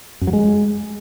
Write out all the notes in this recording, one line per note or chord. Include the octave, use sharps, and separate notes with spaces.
F#2
F#3
G#3